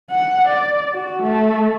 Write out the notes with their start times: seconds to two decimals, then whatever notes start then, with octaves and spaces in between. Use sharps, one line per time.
0.10 F#5
0.48 D5
0.93 F#4
1.23 A3